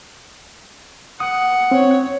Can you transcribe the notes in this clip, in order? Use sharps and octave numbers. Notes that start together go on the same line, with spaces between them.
F#5 D#6
C4 C#5